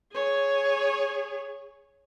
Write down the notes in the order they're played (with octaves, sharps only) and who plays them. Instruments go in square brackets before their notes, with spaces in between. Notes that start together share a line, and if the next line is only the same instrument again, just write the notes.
[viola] G#4 C#5